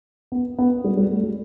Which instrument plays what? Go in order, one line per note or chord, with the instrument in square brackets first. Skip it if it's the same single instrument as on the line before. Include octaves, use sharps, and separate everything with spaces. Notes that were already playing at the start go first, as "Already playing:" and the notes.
[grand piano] B3
B3
G3
G3
A3
G3